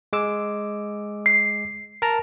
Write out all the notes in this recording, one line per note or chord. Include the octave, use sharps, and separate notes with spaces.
G#3 D6 E6
C7
A#4 A5 A#5